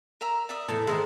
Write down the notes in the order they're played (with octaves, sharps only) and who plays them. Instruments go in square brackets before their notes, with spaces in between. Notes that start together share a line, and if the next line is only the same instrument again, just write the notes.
[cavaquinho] A#4 E5 A#5
D5 E5 D#6
[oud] E2 A2 A4
[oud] G#2 D#3 G#3 [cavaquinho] E5